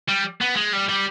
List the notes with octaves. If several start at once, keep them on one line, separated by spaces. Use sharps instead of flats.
G3
B3
G#3
G3
G3